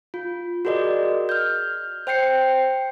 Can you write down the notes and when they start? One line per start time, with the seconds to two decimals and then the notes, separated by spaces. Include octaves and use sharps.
0.14 F4
0.65 F#4 G#4 A#4 D5 D#5
1.29 F6 G6
2.07 C5 G5 G6 C7 C#7